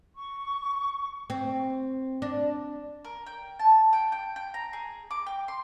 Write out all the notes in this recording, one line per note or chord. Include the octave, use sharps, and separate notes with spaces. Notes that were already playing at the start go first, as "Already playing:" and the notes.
C#6
C4
D4
A#4
G5
A5
G5
G5
G5
A#5
G#4
D6
G5
C6